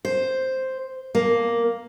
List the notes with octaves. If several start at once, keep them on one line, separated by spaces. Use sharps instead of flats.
C5
A#3